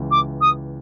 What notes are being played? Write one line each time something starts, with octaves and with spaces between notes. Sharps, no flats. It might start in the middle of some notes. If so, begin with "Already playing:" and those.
Already playing: C#2 E3
D6
D#6